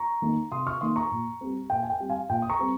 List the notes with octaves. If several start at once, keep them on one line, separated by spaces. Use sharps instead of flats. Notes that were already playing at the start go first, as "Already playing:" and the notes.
Already playing: A#5 C#6
D#3 A#3 D#4
C3 C6 D#6
C#6 F6
D#3 A#3 D#4 C6 D#6
A#5 C#6
A#2
G3 C4
A#2 G5
G#5
G5
G3 C4
F5 G#5
A#2 G5
D#6
A#5 C#6
G3 C4